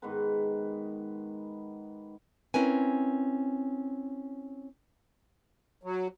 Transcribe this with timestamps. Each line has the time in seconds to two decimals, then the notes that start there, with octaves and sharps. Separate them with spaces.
0.02 G#2 D#3 B3 B4
2.54 C4 C#4 E4 A#4 B4 G#5
5.83 F#3